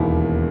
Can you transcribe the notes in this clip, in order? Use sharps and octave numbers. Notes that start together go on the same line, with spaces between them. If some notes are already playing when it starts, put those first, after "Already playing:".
Already playing: E1 D#2 D#3 E4